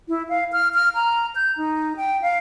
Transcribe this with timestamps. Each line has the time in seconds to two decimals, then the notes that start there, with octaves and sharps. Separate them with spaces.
0.09 E4
0.29 F5
0.53 F6
0.74 F6
0.95 A#5
1.35 G6
1.57 D#4
1.97 G5
2.22 F5